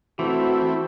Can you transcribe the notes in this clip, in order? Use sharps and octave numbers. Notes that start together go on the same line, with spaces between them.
E3 A3 C4 E4 F#4